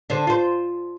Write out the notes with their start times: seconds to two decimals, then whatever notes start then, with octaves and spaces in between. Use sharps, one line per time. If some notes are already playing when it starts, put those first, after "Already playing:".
0.10 D3 D4 C5
0.27 F4 C5